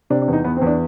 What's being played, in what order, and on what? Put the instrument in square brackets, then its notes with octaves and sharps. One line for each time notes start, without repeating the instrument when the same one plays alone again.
[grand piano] C3 D4
D4
E2 D#4
E2 B3
C4
E2
D4